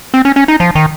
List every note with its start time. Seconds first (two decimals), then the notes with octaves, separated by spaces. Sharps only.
0.14 C4
0.25 C#4
0.36 C#4
0.48 D#4
0.60 F3
0.75 D#3